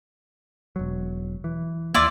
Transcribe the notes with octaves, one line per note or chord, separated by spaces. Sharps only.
E1 F#3
E3
D#2 A#3 E4 F4 D5